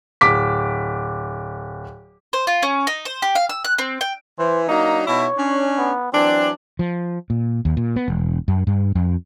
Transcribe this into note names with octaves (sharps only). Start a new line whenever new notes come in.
D1 D6 B6
C5
F4
C#4
D#4
C5
G4
F5
E6
F#6
C4
G5
E3 C5
F#3 A#3 D4 D#4
B2 D#4 E4 C#5
C#4 D4
B3
E3 F#3 C4 D4
F3
A#2
D#2
A#2
B3
E1
F#2
G2
F2